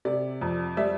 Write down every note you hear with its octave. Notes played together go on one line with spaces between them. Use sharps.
C3 D5
F2
G3 D5 E5